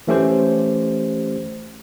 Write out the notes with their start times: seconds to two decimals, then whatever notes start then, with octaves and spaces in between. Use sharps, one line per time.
0.07 E3 A3 C#4 G4 C5